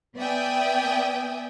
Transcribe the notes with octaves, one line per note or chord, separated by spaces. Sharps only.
B3 D5 E5 G5 G#5 D#6